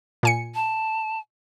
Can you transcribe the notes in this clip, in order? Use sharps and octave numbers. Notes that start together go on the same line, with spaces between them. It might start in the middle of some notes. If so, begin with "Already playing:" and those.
A#2 G#5 C#7
A5